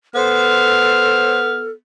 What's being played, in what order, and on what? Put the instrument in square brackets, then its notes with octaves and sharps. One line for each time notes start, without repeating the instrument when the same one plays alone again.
[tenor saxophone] B3 [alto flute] A4 [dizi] C5 [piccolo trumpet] F6